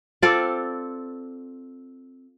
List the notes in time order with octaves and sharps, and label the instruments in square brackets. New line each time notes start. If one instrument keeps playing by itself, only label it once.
[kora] C4 F4 A4 D5